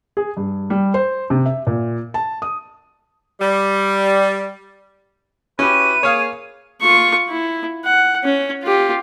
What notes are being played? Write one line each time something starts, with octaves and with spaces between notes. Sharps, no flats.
G#4
G2
G3
C5
C3
E5
A#2
A5
D#6
G3
C#4 E4 F#4 G4 B4 D#7
A#3 G#4 C#5 F5
F4 C#6
E4
F#5
C#4
F4 G4